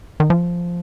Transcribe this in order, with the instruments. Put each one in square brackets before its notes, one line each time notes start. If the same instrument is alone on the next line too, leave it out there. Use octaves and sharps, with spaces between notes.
[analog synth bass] D#3
F3